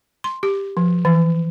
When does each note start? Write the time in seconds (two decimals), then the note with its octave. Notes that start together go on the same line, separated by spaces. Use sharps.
0.24 C6
0.43 G4
0.77 F3
1.05 E3